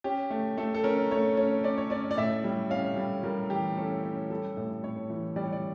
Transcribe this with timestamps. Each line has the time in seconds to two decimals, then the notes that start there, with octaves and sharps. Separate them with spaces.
0.04 C#4 G4
0.30 A3
0.57 A3 A4
0.74 A4
0.84 C#4 A#4
1.11 A3 C#5
1.37 C#4
1.64 C#4 D5
1.78 C#5
1.90 C#4 D5
2.11 D5
2.17 A2 E5
2.44 G3
2.70 C#4 F5
2.97 G3
3.23 G3 A#4
3.50 E3 G4
3.77 C#4 A4
4.03 C#4
4.30 G3 A4
4.57 A2
4.83 A2 C#5
5.10 E3
5.36 G3 D5
5.44 C#5
5.53 D5